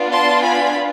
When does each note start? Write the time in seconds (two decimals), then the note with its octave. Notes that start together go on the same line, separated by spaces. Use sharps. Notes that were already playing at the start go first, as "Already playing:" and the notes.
Already playing: B3 D4 F4
0.12 A5 C6
0.43 G#5 B5